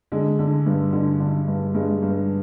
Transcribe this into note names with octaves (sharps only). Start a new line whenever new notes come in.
D3 G#3
D3
G2
D3
D3
G2
G2 G#3
G2